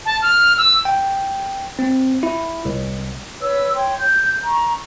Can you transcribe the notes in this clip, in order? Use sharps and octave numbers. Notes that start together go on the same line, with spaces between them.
A5
F6
E6
G5
C4
E4
C2
B4 C#5 E6
C#5 G5 C6
G6
A#5 C#6